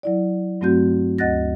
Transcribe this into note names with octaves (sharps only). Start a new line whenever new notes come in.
F#3 E4 D5
G2 F#3 A3 C4 F#4 G6
D2 D#5 F#5 F#6 A6 A#6